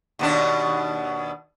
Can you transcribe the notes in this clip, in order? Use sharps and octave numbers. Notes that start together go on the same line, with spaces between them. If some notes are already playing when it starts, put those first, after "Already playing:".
D#2 B2 D4